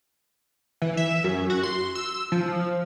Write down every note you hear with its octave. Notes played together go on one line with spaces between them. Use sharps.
E3
E5
F#2
F#4
C6
E6
F3